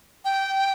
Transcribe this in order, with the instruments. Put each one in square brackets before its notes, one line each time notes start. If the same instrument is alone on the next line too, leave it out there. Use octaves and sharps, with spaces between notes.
[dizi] G5